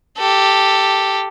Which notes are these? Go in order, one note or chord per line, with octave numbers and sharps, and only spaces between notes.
G4 A4